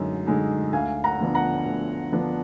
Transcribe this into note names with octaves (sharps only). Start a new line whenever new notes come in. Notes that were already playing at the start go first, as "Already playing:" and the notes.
Already playing: F#2 D3 G#3 D#4
D3 G#3 D#4
D2 F5 G#5
F#5 A#5
D3 F3 B3 D4
F#5 A#5
D2
D3 F3 B3 D4